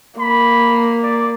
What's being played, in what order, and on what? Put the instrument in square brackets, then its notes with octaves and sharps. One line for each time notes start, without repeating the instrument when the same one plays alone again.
[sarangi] A#3 [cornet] B5
[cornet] D5